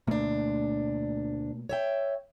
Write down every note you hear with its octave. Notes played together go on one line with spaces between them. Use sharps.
D2 B2 A3 A#3 D4
C#5 E5 G5